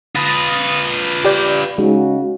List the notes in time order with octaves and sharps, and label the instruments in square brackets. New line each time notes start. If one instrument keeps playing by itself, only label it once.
[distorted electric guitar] F4 B4 [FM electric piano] D#6 A6 A#6
[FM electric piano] G4 D5 G6
[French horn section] C#3 F#4 [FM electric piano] G#3 D#4